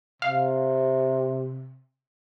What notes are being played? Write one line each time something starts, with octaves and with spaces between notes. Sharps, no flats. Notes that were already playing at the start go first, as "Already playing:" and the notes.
C3 F5